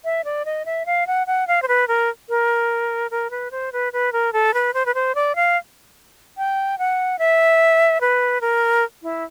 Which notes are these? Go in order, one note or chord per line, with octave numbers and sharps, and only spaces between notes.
E5
D5
D#5
E5
F5
F#5
F#5
F5
C5
B4
A#4
A#4
A#4
B4
C5
B4
B4
A#4
A4
B4
C5
B4
C5
D5
F5
G5
F#5
E5
B4
A#4
E4